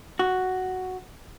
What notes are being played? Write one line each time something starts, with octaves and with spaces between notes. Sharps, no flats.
F#4